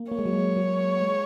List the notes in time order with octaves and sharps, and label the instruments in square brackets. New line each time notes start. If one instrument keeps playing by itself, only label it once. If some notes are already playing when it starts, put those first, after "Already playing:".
Already playing: [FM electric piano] A#3
[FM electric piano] A#3 [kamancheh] C#5
[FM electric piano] G#3
F#3
G#3
F#3
G#3